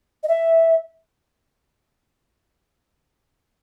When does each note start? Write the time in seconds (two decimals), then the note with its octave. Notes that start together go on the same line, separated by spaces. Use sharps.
0.23 D#5
0.28 E5